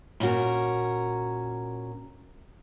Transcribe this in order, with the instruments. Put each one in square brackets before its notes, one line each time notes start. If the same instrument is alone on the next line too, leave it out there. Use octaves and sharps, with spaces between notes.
[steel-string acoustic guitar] A#2 C#4 E4 F#4 A#4